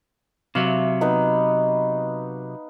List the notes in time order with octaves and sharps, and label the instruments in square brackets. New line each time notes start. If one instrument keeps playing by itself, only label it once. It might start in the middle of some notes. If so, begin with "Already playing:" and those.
[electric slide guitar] C3 F#3 [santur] E5 F5
[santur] B3 D#4 B4